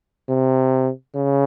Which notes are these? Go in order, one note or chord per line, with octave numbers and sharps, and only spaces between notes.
C3
C#3